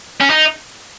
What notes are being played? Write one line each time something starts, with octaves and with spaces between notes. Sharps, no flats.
C#4
D#4